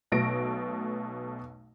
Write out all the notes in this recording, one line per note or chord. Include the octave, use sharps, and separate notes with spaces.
B1 B2 A3 A#6 D7